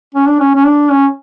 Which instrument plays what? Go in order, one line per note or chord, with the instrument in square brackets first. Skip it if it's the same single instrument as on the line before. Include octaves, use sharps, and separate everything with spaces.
[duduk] C#4
D4
C#4
C#4
D4
C#4